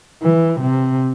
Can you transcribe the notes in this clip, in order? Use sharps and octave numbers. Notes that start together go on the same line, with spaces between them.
E3
C3